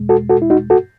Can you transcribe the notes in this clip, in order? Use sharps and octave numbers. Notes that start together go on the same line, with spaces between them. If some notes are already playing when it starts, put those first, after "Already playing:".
Already playing: E2 B2 G#3
F#4 A4
F#4 A4
E4
D#4 F#4
F#4 A4